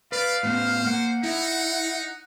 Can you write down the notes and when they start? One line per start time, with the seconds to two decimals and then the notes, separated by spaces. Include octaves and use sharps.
0.12 B4 D5 F5
0.43 A2 B3 C5
0.86 A#3 F#5
1.24 D#4 E4